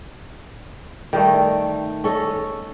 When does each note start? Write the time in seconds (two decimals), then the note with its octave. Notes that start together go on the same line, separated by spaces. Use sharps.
1.13 D#3 G3 A3
2.04 C#4 A4 D#5